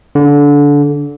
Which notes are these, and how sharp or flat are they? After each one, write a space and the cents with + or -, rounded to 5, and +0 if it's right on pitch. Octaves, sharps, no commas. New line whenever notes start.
D3 -25